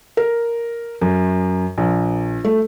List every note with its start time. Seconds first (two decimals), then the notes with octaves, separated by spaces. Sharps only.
0.17 A#4
1.01 F#2
1.78 A#1
2.45 A3